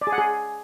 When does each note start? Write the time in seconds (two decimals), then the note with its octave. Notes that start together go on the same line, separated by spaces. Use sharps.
0.01 D5
0.07 G#4
0.12 F#5
0.18 G#4